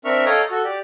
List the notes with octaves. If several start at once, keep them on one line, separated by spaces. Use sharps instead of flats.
C4 D4 A#4 E5 C#6 F6
A4 C#5 D#5 F5 G5 A#5
F#4 A4
G4 D5